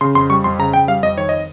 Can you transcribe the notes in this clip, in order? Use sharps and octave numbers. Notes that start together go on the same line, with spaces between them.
C#3 C6
F2 C6
G3 C#6
F2 C6
C#3 A#5
F2 G5
G3 F5
F2 D#5
D#3 C#5
D#5